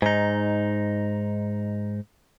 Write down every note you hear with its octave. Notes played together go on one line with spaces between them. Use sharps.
G#2 D#4